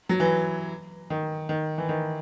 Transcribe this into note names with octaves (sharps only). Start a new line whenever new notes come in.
F#3
E3
D#3
D#3
E3
D#3